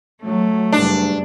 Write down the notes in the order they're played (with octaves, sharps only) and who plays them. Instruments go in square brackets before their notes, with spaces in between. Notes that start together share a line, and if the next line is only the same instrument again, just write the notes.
[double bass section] F#3 [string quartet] A3
[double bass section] F#1 G2 [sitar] D4